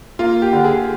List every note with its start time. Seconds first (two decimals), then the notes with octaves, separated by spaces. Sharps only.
0.19 A#3 F4
0.42 G4
0.53 D3
0.64 G#4